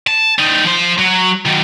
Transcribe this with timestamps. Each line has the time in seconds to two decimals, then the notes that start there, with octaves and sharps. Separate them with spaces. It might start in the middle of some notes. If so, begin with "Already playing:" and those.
0.07 A5
0.38 G3 D#4
0.65 F3 C5
0.98 F#3
1.45 D#3 F#3